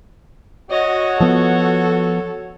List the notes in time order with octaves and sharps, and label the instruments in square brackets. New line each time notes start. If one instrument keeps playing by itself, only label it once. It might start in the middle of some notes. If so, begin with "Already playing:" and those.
[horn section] F#4 C#5 [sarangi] D#5
[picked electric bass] F3 B3 [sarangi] A4